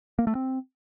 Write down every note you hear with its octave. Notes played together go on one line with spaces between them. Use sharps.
A#3
A3
C4